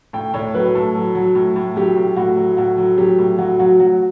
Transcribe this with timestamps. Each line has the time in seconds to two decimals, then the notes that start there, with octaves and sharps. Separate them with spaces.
0.13 A2 G5
0.34 A2 C#5
0.54 F#3 B4
0.75 A2 A4
0.95 F#3
1.15 F#3
1.35 A2
1.56 A2
1.76 F#3 G4
1.96 A2
2.17 A2 F#4
2.37 F#3
2.57 A2 F#4
2.78 F#3
2.98 F#3 G4
3.18 A2
3.39 F#3 F#4
3.59 F#3 F#4
3.80 F#3 F#4